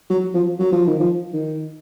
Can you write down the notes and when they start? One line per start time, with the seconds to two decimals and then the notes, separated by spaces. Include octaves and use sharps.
0.10 F#3
0.34 F3
0.60 F#3
0.73 F3
0.87 D#3
1.00 F3
1.33 D#3